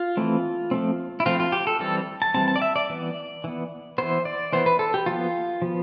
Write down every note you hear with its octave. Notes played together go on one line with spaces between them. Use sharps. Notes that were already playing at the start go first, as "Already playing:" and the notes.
Already playing: F4
E3 A3 C4
F3 A3 C4
E4
F3 A3 C4 F4
F4
G4
A4
E3 G3 C4 A4
A5
E3 G3 C4 A5
A5
D5
E5
D5
E3 B3
E3 B3
E3 B3 C5
D5
E3 B3 C5
B4
A4
G4
F3 B3 F4
F3 B3